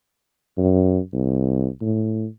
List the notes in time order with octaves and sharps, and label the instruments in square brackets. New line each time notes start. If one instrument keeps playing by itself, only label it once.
[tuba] F#2
C2
A2